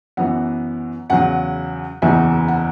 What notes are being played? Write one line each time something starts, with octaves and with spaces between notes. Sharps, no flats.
F#2 E3 B3 F#5
E2 C#3 F#3 F#5
F#1 E2 E3 B3 E5
F#5